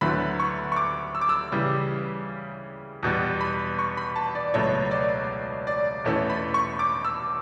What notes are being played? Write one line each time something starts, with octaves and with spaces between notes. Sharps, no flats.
D2 D3 F#3 B3 E4 B5
C#6
C#6
D6
E6
D6
E6
C#3 E3 G3
E2 B2 G3 B3
B5
C#6
B5
A5
D5
C#2 B2 F#3 A3 C#5
D5
D5
E2 B2 A3 C#4 E4
B5
C#6
D6
E6